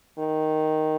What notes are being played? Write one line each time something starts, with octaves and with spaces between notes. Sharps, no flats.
D#3